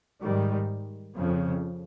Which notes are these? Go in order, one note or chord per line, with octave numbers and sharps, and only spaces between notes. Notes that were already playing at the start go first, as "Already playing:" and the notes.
G#2 D#3 G3
F2 C#3 F3